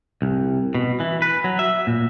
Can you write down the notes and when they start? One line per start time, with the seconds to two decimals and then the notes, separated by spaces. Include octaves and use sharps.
0.22 C2
0.75 B2
1.00 E3
1.22 B4
1.44 F#3
1.59 E5
1.87 A#2